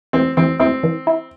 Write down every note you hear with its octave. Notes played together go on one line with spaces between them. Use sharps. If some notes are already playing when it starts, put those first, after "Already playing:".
E3 C4
E3 C4
C4 E4
E3
E4